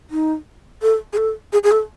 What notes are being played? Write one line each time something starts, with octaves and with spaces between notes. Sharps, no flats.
D#4
A4
G#4
A4
G#4
G#4
A4